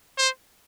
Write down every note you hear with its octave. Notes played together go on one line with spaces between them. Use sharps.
C5